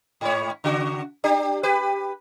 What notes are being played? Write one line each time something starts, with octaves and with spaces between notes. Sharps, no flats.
G#2 C#5
C#3 F#4
D4 G4
G4 B4